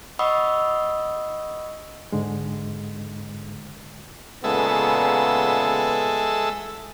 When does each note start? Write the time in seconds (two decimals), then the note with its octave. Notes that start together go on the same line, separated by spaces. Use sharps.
0.19 D#5 F#5 B5 C#6 D#6 E6
2.12 G#2 D3 G#3
4.44 A#2 C#3 G#3 B3 A4 E5